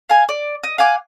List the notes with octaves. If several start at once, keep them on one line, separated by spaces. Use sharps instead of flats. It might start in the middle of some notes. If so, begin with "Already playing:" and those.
F5 G#5
D5
D#5
F5 F#5 G#5 D6